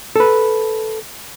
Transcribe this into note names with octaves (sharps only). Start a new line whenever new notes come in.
A4 B4